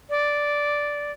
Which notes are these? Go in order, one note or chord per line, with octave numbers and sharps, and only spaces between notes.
D5